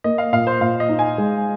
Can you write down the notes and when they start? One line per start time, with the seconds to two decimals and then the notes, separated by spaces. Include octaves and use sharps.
0.04 A#3 D#5
0.18 F5
0.32 A#2 F5
0.47 C5
0.61 A#2 F5
0.80 D#5
0.89 D#4
0.99 G#5
1.18 G#3